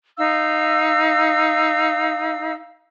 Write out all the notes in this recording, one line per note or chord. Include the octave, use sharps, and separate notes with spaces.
D#4 F5 E6